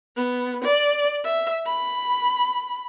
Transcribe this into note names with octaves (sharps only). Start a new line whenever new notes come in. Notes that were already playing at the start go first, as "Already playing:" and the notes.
B3
D5
E5
B5